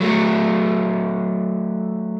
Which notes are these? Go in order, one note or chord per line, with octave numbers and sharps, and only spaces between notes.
F#3 A3